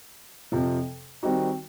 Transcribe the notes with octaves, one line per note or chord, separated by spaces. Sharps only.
F2 C3 F3
D#3 G3 C4 D#4 F#4